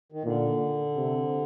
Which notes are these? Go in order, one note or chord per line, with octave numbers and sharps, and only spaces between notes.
D#3
A#2 D3
C3